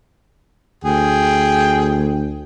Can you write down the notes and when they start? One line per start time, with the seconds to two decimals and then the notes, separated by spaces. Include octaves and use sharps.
0.84 D2 G#4 G5